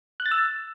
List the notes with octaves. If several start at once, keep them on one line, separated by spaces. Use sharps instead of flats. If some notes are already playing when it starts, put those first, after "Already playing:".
F#6
A6
E6